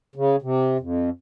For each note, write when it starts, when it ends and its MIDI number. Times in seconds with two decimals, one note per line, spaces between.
0.16 0.36 49
0.42 0.77 48
0.80 1.10 41